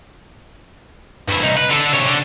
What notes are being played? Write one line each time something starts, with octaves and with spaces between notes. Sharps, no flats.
G2 E4
C2 D#4
B4
D3 A4
C3 C#5
D3